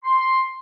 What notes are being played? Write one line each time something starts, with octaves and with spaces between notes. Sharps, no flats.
C6